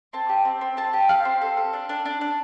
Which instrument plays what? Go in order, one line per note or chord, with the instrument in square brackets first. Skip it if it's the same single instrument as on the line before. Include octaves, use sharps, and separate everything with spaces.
[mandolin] C4 A5
G4
C4
C4
C4 A5
G4
G4 F5
C4
A4
A4
D4
D4
D4
D4